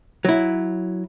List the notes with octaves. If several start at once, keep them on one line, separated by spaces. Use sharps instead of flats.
F#3 E4